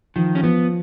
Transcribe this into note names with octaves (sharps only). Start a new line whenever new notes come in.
D#3 F3
C#4
F3 B3